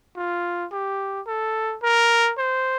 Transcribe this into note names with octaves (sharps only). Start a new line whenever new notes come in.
F4
G4
A4
A#4
C5